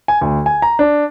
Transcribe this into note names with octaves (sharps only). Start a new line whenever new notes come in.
G#5
D2
G#5
A#5
D4